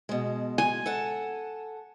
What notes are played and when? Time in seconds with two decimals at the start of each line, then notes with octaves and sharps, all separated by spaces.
0.09 B2 G#3
0.58 G#5
0.86 A4 F#5 A5